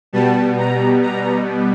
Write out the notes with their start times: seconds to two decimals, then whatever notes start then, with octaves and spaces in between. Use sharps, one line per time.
0.13 B2 G3 B3 A5
0.58 A#5
1.02 A#5